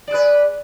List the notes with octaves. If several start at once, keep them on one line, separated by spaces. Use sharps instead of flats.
G#4 B4 D5